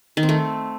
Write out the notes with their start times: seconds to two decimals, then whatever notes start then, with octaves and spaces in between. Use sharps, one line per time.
0.17 D#3
0.23 C4
0.29 A3